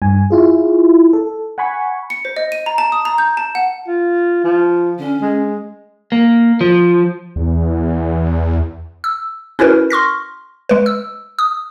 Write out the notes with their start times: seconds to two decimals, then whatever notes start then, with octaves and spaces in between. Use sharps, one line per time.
0.02 G2 G#5
0.30 E4 F4 G#4
1.13 A4
1.58 F#5 G#5 B5 C#6
2.10 C#7
2.25 C5
2.36 D#5
2.52 D#7
2.66 A#5
2.78 A5
2.92 D#6
3.05 A#5
3.18 G6
3.37 A5
3.55 F#5
3.87 F4
4.44 F3
4.99 D3 C#4
5.22 G#3
6.12 A#3
6.61 F3
7.36 E2
9.04 E6
9.59 C#4 E4 F#4 A#4 B4
9.90 C6 C#6 F6 A#6
10.69 G#3 B4
10.86 E6
11.39 D#6